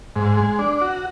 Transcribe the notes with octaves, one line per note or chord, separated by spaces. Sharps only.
G#2
G#3
D4
F#4